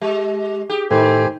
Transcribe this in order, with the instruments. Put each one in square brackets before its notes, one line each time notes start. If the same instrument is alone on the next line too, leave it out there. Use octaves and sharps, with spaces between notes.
[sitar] G#3 [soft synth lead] G4
[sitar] G4 [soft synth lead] G#4
[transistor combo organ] A2 [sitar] D#3 [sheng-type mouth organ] G4 C5 G#5 [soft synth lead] A4